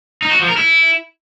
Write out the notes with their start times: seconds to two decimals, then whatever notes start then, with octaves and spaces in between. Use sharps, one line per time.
0.22 D#4
0.31 F#4
0.40 F3
0.48 A#4
0.57 E4